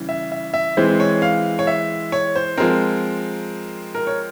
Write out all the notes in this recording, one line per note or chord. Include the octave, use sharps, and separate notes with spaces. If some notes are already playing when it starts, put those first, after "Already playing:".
Already playing: C#3 E3 G3
E5
E5
E5
E3 G#3 C4 C5
C#5
F5
C#5
E5
C#5
C5
F3 G#3 C4 A#4
A#4
C#5